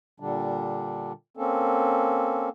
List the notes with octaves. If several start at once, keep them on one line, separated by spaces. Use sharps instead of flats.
A#2 D3 G3 D4
A#3 C4 C#4 A4